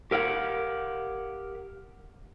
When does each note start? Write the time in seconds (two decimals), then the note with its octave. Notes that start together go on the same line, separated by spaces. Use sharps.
0.11 G4 A#4 F5 F#5